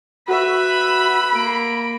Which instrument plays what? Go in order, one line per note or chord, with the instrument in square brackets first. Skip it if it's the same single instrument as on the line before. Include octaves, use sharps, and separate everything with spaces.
[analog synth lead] F#4 [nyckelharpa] B4 E5 [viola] B5
[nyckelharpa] A#3 [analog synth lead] D7